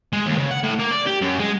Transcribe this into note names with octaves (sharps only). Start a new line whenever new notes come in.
G#3
D#2
C#3
F#5
A2
A#3
D5
G4
F#2
G#3